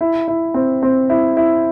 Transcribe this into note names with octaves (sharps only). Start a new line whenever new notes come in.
E4
E4
C4
C4
E4
E4